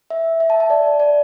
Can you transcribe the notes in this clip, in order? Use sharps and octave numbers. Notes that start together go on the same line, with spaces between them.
E5
E5
A5
A5
D5
D5